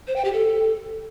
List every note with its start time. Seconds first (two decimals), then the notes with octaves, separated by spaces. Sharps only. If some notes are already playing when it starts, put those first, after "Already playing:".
0.07 C5
0.16 G5
0.25 G4
0.33 A4